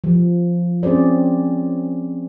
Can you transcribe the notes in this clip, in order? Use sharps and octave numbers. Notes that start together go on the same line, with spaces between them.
F3
C4 C#4 G#4 C5 D5